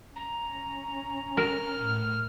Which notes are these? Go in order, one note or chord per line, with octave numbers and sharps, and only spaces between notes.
C#4 A#5
A#4 F6
A2